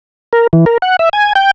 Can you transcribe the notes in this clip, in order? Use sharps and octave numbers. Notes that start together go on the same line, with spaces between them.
A#4
E3
A#4
F#5
E5
G#5
G5